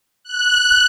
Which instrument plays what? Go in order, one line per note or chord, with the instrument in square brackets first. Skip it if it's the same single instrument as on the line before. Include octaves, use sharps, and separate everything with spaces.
[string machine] F#6